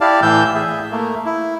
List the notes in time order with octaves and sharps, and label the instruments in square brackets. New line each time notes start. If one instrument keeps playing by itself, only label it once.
[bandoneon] E4 G4 D5 F5 A5
A2 E3 E6 G6
G#4 E5
A3 A#3
E4